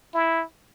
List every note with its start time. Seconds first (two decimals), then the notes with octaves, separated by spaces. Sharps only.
0.14 E4